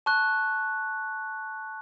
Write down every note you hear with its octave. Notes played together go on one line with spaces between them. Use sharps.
A5 C#6 F#6